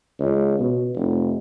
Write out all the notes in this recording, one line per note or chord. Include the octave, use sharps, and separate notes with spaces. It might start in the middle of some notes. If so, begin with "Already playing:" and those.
C#2
B2
F1